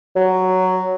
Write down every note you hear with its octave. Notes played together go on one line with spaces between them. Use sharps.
F#3